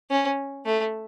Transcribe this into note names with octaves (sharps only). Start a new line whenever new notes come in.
C#4
A3